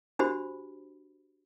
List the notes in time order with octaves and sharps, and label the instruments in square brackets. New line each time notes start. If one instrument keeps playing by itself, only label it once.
[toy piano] D4 F#4 G4 C5 B5